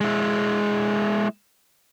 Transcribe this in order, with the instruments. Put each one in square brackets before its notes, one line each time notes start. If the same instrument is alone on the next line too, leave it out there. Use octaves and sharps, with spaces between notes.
[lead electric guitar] G#3 E4